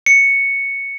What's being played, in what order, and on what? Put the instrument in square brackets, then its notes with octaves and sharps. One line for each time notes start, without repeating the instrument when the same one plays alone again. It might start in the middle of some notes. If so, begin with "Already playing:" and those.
[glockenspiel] C#7